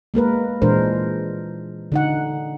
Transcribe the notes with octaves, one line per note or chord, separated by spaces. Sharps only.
G#3 A#3 A#4 B4
A#2 E3 G#3 D4 A#4 C5
D3 D#4 F#5